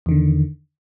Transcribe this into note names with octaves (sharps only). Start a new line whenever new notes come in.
E2 D3 D#3